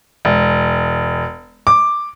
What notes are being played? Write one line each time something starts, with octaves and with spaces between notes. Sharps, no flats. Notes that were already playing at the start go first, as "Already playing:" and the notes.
E1
D6